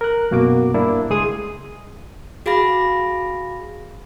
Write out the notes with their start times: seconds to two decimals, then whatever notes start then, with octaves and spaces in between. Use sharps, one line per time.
0.01 A#4 F#6
0.31 F#2 B2 A#3 F#4 D6
0.74 G2 A#3 D4 E4
1.10 C#2 G#3 G#4 G#5 C6 D#6
2.46 F#4 G#4 F5 B5 A#6